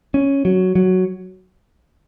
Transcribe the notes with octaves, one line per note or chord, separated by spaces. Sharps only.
C#4
F#3
F#3